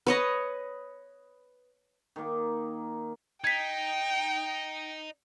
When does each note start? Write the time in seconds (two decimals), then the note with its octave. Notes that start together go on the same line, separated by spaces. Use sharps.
0.07 B4 C#5 D#5
2.16 D#3 A#3
3.44 D#4 G5 G#6 B6